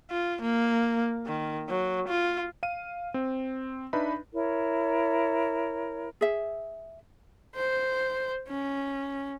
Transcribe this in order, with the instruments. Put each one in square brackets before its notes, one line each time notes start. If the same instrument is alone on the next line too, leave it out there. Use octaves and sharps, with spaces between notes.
[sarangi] F4
A#3
D#3
F#3
F4
[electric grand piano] F5 D#7
C4
D4 D#4 B4 E5 B5
[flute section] E4 A#4 C#5
[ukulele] G#4 E5
[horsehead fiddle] C5
C#4